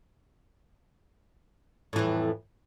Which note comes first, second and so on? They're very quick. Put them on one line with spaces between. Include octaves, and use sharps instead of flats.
A2 E3 F2